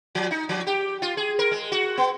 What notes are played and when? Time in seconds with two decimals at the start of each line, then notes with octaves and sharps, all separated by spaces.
0.15 F3
0.31 D#4
0.49 F3
0.67 G4
1.02 F4
1.17 G#4
1.39 A#4
1.51 G#3
1.72 F#4
1.98 B3